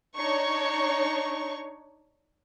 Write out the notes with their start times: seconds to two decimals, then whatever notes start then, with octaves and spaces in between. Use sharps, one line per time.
0.15 D4 D#4 C#5 C#6